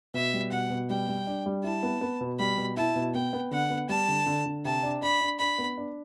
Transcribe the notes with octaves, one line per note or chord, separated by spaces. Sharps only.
B2 E5
G3
B2 F#5
B2
G3 G5
G3
D4
G3
E4 A5
B3
B3
B2
G3 B5
B2
E4 A5
B2
B3 G5
B3
D3 F#5
B3
G3 A5
D3
D3
D3
C3 A5
D4
D4 B5
D4
D4 B5
B3
D4